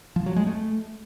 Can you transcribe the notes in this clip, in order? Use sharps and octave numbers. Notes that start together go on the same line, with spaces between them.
F3
F#3
G#3
A3